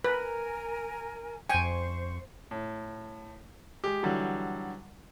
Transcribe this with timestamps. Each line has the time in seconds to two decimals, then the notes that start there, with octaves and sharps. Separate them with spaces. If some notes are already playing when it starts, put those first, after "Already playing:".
0.04 A#4 B4 G#5
1.49 F2 C5 G5 G#5 C#6
2.51 A2
3.84 G#3 G4
4.03 D3 E3 F#3 G3